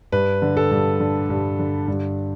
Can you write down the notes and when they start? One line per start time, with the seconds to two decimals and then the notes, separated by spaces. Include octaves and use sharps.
0.12 G2 B4
0.42 D3
0.57 A4
0.71 G2
1.00 D3
1.30 G2
1.59 D3
1.88 G2